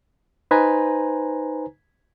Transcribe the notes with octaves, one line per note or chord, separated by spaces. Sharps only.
D#4 B4 C5 G#5 A#5